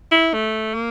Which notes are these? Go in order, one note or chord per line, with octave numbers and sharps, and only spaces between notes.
E4
A3
A#3